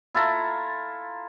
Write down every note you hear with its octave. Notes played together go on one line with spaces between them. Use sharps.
E4 F4 A4 A#5